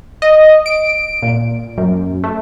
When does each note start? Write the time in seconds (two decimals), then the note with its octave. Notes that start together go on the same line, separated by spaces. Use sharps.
0.22 D#5
0.66 D7
1.22 A#2
1.78 F#2
2.24 A3